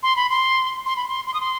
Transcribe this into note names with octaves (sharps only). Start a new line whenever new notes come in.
C6
B5
C6
C6
B5
C6
C6
D#6
C6